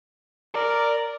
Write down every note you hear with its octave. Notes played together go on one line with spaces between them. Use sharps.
A#4 D5